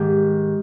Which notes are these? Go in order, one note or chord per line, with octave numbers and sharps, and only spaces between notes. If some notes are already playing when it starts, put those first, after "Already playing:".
Already playing: G#2 D#3 G4